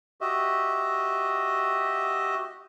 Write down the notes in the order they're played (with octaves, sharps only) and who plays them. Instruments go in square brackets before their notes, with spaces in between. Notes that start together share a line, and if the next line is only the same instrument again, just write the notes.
[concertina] F#4 G4 D#5 E5